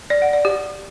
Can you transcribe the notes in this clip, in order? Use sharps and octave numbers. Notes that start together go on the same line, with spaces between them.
D5
F#5
D5
G4